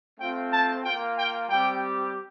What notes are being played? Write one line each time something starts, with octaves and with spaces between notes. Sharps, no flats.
A3 C4 F4 G5
A5
A#3 F4 G5
G5
G3 C4 G4 G5